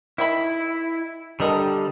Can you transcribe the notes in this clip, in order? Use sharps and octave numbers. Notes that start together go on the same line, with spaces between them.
D#3 E4 E5 B5
D3 G3 A4 A#4 D#5